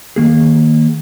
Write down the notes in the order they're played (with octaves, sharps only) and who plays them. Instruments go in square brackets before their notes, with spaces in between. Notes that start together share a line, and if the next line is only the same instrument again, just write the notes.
[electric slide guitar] D#3 A#3 G#4